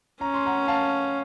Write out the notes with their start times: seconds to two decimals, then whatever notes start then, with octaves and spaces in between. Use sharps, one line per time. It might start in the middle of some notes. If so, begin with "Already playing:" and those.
0.21 C#4 A#5
0.34 C6
0.46 F#5 A#5
0.68 F5 A5